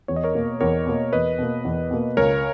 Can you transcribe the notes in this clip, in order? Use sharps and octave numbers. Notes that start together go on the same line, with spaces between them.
E2 C#5
D#5
A#4 C#5
B2 A#3
E2 A#4 C#5
B2 A#3
E2 B4 D#5
B2 A#3
E2
B2 A#3
C#2 A#4 C#5